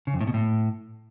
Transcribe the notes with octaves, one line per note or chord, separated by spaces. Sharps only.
C#3
F2
A2
B2
A2